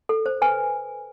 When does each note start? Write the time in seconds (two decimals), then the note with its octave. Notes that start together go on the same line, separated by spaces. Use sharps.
0.09 A4
0.26 C5
0.42 B4 G#5